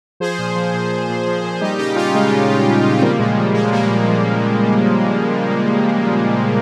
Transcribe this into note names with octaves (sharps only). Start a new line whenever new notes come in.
F3 G#4 C5
A#2
F3
A#2
F3
A#2
F3
A#2
G3 D#4 G4
C#3 D#4 G4
G3 C#4 F4
C#3 G#3
G3 G#3
C#3
G3
C#3
C4
F3 G3 A#3
A#2 G#3
F3 G3
A#2 G#3
F3 G3 A#3
A#2
F3